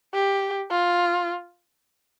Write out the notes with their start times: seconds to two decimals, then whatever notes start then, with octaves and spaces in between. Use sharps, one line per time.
0.14 G4
0.71 F4